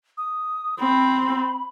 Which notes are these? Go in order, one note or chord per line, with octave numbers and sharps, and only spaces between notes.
D#6
C4 B5